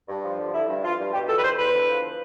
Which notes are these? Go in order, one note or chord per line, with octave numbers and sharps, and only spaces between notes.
G2
F3
D3
D3 E4
G2
F3 F4
G2
B2 G4
E2 A4
B4
E2 C5
E2 B4
D3
F3